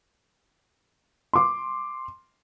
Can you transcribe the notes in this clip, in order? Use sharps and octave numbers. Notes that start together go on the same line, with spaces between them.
C6 D6